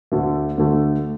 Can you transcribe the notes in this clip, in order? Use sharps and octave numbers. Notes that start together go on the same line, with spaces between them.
D2 D3 A3
D2 D3 A3